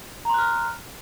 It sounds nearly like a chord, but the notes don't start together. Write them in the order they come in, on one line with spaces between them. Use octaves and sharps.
A#5 C6 F#6 F6